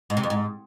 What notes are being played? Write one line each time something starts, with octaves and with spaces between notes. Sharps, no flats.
G#2
C3
F2
G#2